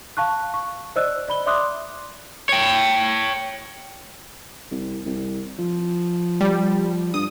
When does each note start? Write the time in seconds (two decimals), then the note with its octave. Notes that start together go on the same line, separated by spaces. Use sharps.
0.17 F5 A5 C#6 F#6
0.54 C#6
0.96 C5 D5 D#5 E6 F#6
1.28 D5 B5 G7
1.46 D5 E5 C6 D6 D#6 F#6
2.49 C#5 G5
4.71 C2
5.06 C2
5.59 F3
6.41 G3
7.14 G2 D#6